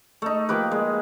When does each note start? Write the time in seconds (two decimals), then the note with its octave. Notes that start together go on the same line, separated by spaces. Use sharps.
0.22 A3 D#4
0.49 F3 A#3 G4 B4
0.72 G#3